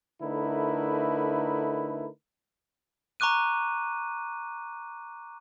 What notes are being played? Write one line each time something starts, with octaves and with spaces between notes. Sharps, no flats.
D3 A3 D#4 E4 A#4 B4
A#5 C#6 D6 F#6 D#7